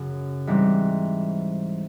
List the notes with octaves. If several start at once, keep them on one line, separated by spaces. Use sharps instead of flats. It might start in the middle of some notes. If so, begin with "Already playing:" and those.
Already playing: F#2 C#3
G#2 E3 G3 C4